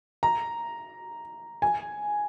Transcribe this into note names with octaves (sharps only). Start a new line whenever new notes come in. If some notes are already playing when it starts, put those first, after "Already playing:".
A#5
G#5